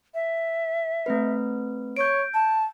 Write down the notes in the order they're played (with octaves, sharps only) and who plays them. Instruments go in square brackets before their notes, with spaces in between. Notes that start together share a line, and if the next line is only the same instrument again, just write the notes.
[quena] E5
[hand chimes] A3 C4 B4
[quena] C#5 [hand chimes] G6 D7
[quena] A5